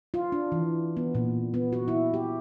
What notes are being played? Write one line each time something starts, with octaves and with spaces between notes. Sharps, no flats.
F4
D4
E3
B3
A#2
B3
F#4
E4
G4